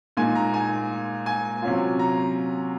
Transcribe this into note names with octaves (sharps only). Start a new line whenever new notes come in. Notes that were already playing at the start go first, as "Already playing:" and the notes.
A#2 G#3 D#4 G#5
A#5
G#5
G#5
C3 F#3 C#4 F4
A#5